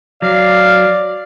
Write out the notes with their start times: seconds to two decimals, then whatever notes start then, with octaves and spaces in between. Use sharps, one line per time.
0.22 F#3 D5 F5